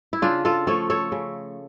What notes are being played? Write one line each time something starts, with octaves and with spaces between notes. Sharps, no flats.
E4
C#3 D4 F4
F4 A4
F3 A3 A4 C#5
A4 C#5
C#3